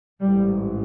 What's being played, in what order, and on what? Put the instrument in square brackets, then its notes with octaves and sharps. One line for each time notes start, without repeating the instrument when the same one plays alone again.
[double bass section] A1 G#2 G3